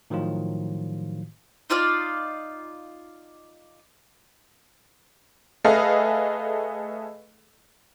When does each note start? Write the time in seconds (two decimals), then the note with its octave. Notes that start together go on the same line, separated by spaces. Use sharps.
0.10 A2 D#3 F3 F#3 F4
1.70 D#4 F4 D5 F5
5.64 A3 G#4 A4 B4 D#5 F5